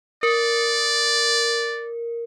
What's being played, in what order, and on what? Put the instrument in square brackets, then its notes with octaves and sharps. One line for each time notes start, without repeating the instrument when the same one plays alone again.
[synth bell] A#4 [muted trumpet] D5